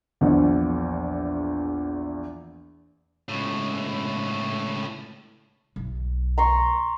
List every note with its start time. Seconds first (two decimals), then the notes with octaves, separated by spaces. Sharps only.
0.21 A#1 E2
3.29 C#2 A2
5.76 B1
6.38 A#5 C6 C#6